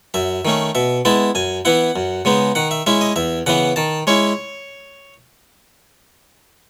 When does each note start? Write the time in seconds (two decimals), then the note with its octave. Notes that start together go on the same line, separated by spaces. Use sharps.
0.14 F#2 E5
0.45 D#3 A3 C#4
0.75 B2 E5
1.05 G#3 B3 E4 A5
1.35 F#2 G#5
1.65 E3 B3 E4 F#5
1.96 F#2
2.25 C#3 G#3 B3 D#4
2.55 D#3 F#5
2.71 E5
2.87 G#3 C#4 E4 E5
3.01 D#5
3.16 E2 E5
3.46 C#3 E3 B3 F#5
3.76 D#3 A5
4.07 G#3 C#4 E4 C#5